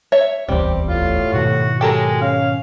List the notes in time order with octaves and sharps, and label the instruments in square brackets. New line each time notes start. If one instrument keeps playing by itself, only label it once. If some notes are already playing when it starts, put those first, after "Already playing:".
[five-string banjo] C#5 E5
[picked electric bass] D1 G1 E2 [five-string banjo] G3 [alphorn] C4 [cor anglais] G4
[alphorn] A2 [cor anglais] F4
[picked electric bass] G#2 B2 D#3 [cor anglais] F#4
[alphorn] F#3 [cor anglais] G#3 [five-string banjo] G4 A4 A#4
[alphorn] C#4 [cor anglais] F5